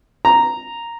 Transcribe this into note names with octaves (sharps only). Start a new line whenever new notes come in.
A#5